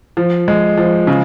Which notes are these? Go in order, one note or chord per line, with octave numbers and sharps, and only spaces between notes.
F3
G#3
F3
C#3